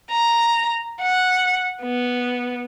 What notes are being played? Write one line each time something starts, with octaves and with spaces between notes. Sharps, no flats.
A#5
F#5
B3